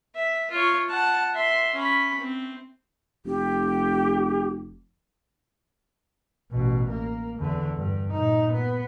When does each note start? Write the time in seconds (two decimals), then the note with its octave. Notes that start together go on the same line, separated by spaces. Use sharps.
0.15 E5
0.51 F4 C#5
0.89 F#5 A5
1.34 E5 C6
1.74 C#4 B5
2.20 C4
3.26 F1 G4
6.52 A1 B2
6.90 A#3
7.39 E2 D3
7.77 G2
8.11 A#2 D#4
8.53 B3